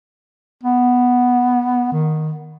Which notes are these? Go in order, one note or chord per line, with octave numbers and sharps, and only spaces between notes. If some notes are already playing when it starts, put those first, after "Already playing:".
B3
D#3